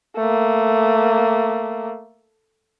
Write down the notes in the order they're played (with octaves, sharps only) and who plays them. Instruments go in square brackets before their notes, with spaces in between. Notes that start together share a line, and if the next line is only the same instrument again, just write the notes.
[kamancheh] A3 A#3